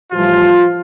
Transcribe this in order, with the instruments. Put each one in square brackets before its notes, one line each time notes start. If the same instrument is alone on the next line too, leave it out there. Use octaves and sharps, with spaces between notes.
[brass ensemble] A2 E3 F3 G3 F4